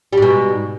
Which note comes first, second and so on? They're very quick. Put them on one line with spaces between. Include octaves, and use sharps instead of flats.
G3 G#2 B2